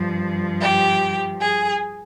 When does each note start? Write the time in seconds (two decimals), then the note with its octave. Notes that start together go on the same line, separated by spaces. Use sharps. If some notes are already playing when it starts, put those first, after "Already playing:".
Already playing: G2 F3
0.61 G4
1.41 G#4